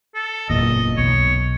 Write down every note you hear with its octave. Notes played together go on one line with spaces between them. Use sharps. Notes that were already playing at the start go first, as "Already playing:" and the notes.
A4
F#1 E2 A#2 D#5
B1 C#5